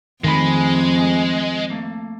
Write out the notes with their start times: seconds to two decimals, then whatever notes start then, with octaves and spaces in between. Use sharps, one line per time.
0.24 F2 D#3 G#3 A3 G5 B5
1.70 A3 A#3